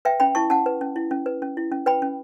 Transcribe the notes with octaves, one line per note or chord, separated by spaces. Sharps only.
B4 E5 G5
C#4 G5 B5
E4 A5 C#6
C#4 F#5 A5
B4
C#4
E4
C#4
B4
C#4
E4
C#4
B4 G5 B5
C#4